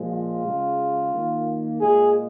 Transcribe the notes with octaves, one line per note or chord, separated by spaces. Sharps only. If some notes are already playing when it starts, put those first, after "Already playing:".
Already playing: A#2 F3 G#3
F4
C#3 G#3
D#3 A#3
A#2 G#3 G#4